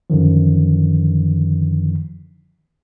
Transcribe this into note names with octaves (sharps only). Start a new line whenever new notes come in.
F#2 D3 D#3 F3